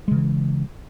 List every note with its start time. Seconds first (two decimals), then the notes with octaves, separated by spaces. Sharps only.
0.08 G#3
0.11 C#3
0.15 E3